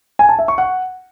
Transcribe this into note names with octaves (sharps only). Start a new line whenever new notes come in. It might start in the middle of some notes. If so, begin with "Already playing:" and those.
G#5
A5
E5
C#6
F#5